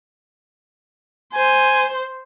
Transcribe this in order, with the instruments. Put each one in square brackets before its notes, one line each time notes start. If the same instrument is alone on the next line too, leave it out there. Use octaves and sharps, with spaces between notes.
[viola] C5 [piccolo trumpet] G#5